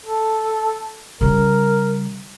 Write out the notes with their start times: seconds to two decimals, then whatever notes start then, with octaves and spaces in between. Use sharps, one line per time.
0.05 A4
1.21 C#3 G3 A#4